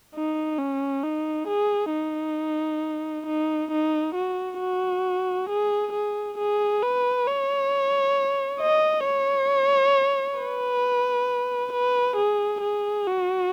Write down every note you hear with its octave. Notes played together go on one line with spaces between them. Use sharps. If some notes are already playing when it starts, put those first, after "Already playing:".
D#4
C#4
D#4
G#4
D#4
D#4
D#4
F#4
F#4
G#4
G#4
G#4
B4
C#5
D#5
C#5
B4
B4
G#4
G#4
F#4